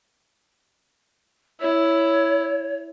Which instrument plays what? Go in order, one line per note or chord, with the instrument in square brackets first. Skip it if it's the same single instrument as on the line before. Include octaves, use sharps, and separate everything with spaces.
[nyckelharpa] E4 [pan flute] C#5